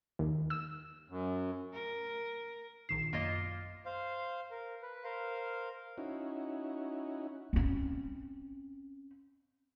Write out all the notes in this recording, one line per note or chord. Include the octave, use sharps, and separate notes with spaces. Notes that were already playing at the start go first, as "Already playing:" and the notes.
D#2
E6
F#2
A#4
A#1 D#3 C7 E7
F#2 A#3 F4 D#5 E7
C5 F5
A#4
B4
A#4 C5 F5
C#4 D#4 E4 F#4
C4 C#4